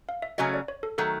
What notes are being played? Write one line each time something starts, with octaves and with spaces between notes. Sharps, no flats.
F5
E5
C#3 F#3 A3 C#4 F#4 D#5
D5
C#5
A4
D#3 F#3 A3 A4